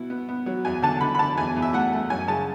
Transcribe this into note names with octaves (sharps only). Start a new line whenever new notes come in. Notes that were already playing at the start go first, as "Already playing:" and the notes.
Already playing: B2 E4
B3
B3
F#3
E2 G#5
D3 A5
D3 B5
B5
D3 A5
E2 G#5
E2
E5
A3 F#5
A3
F#2 G#5
C#3 A5